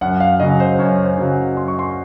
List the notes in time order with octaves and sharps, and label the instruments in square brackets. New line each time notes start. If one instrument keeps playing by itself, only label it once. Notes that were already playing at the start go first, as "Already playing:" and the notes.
[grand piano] F#2 F#5
F5
C#3 F#3 D#5
C5
F#2 C#5
C5
C#3 F#3
F#5
F#2 C6
C#6
C6